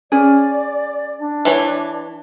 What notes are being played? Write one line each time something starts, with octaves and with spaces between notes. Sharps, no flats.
C#4 G#4 D5
D4
E3 C#5